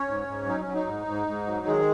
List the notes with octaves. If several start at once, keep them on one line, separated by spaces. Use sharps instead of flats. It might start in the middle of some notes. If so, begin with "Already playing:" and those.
Already playing: C#4 C#5
G#2
G#2
F#3 D#4
C#4
F#3
D#4
G#2
G#2
G#2
F#3
D#3 G#3 G#4